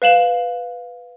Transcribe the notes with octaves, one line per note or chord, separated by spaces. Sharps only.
B4 F5 E7 F#7